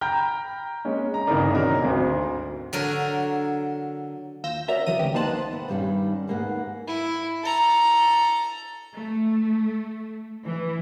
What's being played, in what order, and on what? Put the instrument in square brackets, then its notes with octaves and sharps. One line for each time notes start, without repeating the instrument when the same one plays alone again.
[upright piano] G5 A#5 B5 F6 G6
G#3 A#3 C#4
A#5
G1 C#3 E3 D#4 A#4 D5
B2 D#3 F#3 C#4 F#4 A#4
G#1 D2
[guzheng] D3 F#3 A#4
[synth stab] D#2 F4 E6 G6 A#6
C#4 F#4 A#4 D5 E5 A#5
F#2 C3 E3 D#6 D#7
G#1 D2 G4
A#3 B3 D#4 C5 A5 F#6
[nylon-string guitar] B3
G2 D#3 G3 A#3 B3 C#4
D#2 G#2 A#3 B3 F5 F#5
[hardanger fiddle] E4
A4 A#5
[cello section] A3
E3